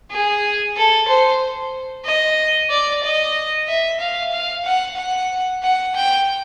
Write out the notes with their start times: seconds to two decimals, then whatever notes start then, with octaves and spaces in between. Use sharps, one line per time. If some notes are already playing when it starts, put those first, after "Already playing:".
0.12 G#4
0.77 A4
1.08 C5
2.06 D#5
2.70 D5
3.03 D#5
3.68 E5
4.00 F5
4.32 F5
4.65 F#5
4.97 F#5
5.63 F#5
5.95 G5